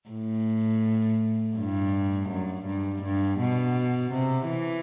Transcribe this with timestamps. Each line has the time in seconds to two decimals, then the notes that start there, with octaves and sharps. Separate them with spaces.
0.10 A2
1.57 G2
2.30 F#2
2.66 G2
3.03 G2
3.40 B2
4.13 C3
4.50 E3